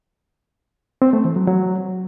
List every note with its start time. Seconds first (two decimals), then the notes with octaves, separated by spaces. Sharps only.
1.02 C4
1.13 A3
1.25 E3
1.36 F#3
1.47 F#3